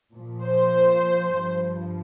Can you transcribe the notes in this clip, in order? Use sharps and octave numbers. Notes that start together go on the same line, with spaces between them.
A#2 F3
C5
G2 F3